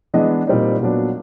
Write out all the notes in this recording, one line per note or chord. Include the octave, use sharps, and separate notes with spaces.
E3 G#3 B3 D4 D#5
A#2 G3 C4 D#4
A#2 F#3 B3 D4